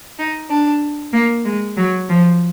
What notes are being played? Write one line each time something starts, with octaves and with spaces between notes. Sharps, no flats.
D#4
D4
A#3
G#3
F#3
F3